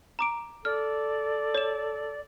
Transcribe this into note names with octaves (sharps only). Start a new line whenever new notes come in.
A#5 D6 D7
A4 D5 F6
C#5 E7